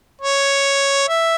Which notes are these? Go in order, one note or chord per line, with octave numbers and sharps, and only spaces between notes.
C#5
E5